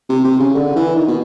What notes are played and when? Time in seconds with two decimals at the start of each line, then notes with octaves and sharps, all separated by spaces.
0.09 C3
0.24 C3
0.39 C#3
0.55 D3
0.76 E3
0.96 D#3
1.07 B2